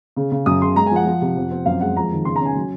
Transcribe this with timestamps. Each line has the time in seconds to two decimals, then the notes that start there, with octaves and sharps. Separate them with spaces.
0.16 C#3
0.32 C#3
0.46 F#2 D#6
0.62 C#3 C6
0.76 G#3 A#5
0.86 G#5
0.91 F3 F#5
1.06 F3
1.22 C3
1.37 F2
1.51 C4
1.66 F#2 F5
1.81 G#3 F#5
1.96 F2 A#5
2.11 D#3
2.25 C#3 C6
2.36 A#5
2.40 C#4 G#5
2.56 F#3